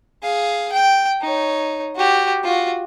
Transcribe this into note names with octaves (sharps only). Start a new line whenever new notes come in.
G#4 F5
G5
D#4 C#5
F#4 G4
F4 F#4